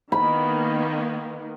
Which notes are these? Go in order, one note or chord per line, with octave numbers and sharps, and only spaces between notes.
D#3 A#3 B3 B5